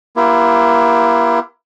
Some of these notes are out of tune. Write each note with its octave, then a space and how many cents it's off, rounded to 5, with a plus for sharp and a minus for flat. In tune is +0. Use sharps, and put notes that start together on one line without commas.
A#3 +40 E4 +35 G4 +0